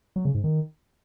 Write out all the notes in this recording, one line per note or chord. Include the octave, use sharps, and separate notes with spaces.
F#3
C#3
G#2
D#3